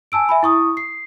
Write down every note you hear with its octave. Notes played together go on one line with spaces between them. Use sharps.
G#5 A5 E6 D7
E5 G#5 B5
E4 C#6 D#6
C7